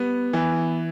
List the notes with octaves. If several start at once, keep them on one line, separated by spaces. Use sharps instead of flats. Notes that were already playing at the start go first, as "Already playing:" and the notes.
Already playing: G3 B3
E3